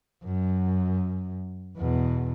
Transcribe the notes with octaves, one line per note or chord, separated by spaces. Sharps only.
F#2
E2 B2